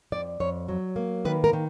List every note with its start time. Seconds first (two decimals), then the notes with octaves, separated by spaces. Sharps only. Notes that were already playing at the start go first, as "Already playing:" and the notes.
0.12 F2 D5
0.40 F2 C#5
0.69 F#3
0.96 A#3
1.25 D#3 B4
1.44 A#4
1.53 D#3